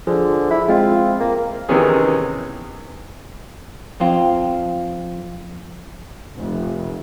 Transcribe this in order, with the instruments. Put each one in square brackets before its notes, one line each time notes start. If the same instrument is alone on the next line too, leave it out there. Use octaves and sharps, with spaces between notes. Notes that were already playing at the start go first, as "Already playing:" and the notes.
[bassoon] D3 [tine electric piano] F3 G#4
[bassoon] E4
[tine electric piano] G#3 C4 [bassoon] F4
[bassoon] A#3
[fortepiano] C3 D#3 E3 B3 C#4 G#4
[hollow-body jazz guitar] F2 C4 F4
[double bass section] F1